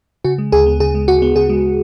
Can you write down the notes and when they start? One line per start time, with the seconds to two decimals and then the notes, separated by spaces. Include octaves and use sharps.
0.24 C#3 F#4
0.38 G#3
0.52 D2 G#4
0.66 B3
0.80 C#3 G#4
0.95 G#3
1.07 D2 F#4
1.22 B3
1.36 C#3 G#4
1.49 G#3